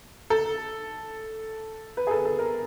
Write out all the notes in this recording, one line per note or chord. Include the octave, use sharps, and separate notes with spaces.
A4
B4
G#4
A4
A4
A#4